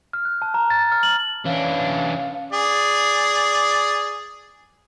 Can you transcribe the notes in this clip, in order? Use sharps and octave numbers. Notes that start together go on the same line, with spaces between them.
F6
F#6
A5
A#5
A6
F6
F#7
E3 C#4 D4 F5
G#4 D5